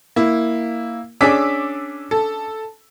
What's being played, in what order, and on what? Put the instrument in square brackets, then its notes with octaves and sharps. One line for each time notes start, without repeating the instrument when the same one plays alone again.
[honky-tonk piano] A#3 E4
[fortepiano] C#4 D4 G#4 [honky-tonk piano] D6 E6 B6
[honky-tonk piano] A4